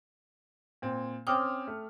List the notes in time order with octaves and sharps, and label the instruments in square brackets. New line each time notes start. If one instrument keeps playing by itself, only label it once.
[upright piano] A#2 C4
[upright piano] C4 C#4 F6 [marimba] G5 D6 D#6
[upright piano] A3